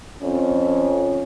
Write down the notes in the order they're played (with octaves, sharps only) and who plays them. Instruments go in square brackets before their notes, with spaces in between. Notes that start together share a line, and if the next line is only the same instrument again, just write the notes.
[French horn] F2 [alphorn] C#4